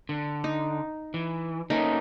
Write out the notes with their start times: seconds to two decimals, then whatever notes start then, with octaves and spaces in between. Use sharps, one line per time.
0.09 D3
0.44 D#4
1.14 E3
1.70 A3 A#3 C#4 D#4